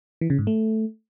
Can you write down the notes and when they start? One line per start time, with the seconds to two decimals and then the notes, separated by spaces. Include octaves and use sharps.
0.21 E3
0.30 C#3
0.39 G#2
0.47 A3